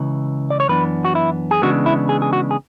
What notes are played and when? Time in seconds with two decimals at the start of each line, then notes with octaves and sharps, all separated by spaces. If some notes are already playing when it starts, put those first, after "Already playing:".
Already playing: C#2 C#3 E3
0.50 D5
0.60 C#5
0.68 F#2 E3 B3 D4 B4
1.05 F#4
1.15 E4
1.51 G#4
1.62 C#3 E3 G#3 B3 D4 F#4
1.86 E4
2.09 G#4
2.22 G#4
2.33 F#4
2.51 G#4